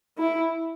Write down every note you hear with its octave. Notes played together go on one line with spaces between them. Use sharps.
E4